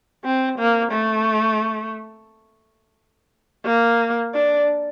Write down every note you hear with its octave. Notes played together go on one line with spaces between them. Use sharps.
C4
A#3
A3
A#3
D4